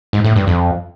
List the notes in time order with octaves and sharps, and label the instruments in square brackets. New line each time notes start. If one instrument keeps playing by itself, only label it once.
[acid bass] G#2
A2
G2
F2